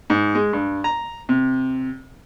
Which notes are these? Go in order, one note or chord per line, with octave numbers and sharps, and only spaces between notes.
G#2
G#3
G2
A#5
C3